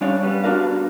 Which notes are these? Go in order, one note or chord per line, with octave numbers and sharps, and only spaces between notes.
G3 C#4 D4 C#5 D5 F5
G3 B3
B3 D4 F#4 A#4 F5